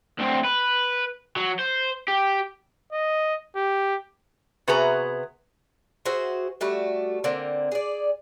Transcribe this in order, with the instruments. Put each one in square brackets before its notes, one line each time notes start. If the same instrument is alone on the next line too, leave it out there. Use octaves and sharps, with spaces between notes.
[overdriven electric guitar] D2 C4
B4
F#3
C5
G4
[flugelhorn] D#5
G4
[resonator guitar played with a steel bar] C3 B3 F#4 G#4 B4 A#5
[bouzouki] F#4 G#4 C5 E5
G3 A3 F#4
D3 A#3 C4
G#4 D5